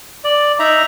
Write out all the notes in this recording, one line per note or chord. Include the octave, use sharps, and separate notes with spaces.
D5
D#4 E5 A#5